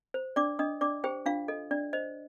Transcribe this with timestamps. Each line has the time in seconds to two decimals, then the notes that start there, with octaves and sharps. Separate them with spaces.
0.14 C5
0.36 D4 D5 D6
0.59 D4 D#5 D#6
0.81 D4 D5 D6
1.04 G4 C5 G5
1.26 D4 F4 F5
1.48 A4 D#5
1.71 D4 D5
1.93 C5 D#5